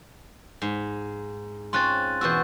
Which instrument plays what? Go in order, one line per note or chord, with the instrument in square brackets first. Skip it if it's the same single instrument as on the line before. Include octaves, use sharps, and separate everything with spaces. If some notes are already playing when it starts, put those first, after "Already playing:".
[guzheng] G#2
[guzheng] C4 C#4 F4 [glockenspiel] C6 F#6 A6
[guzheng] E2 B2 F#4 [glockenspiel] E6 G6